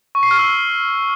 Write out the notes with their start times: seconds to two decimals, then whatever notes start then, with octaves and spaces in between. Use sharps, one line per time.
0.15 C#6
0.23 C7
0.31 F6
0.39 E6